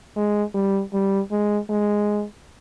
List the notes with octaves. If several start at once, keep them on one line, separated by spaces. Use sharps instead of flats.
G#3
G3
G3
G#3
G#3